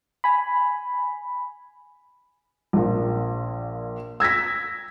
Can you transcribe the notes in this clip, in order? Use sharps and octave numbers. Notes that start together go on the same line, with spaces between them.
G#5 B5
A#1 A#2
E6 G#6 A#6 B6